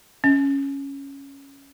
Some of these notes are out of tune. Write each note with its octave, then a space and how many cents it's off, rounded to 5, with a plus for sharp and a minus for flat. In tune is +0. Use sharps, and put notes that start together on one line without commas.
C#4 +0